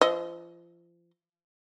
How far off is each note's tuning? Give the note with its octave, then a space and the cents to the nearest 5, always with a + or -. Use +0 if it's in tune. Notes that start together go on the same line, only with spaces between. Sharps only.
F3 -30 D#5 +0